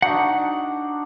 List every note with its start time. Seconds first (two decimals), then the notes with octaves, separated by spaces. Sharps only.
0.02 D4 D#4 F#4 F#5